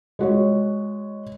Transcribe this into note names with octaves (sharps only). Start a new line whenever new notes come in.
G#3 F#4 C#5